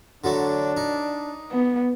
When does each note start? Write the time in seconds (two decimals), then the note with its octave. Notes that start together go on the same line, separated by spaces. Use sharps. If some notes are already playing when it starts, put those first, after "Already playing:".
0.24 D3 F#3 A3 D4
0.77 D#4
1.52 B3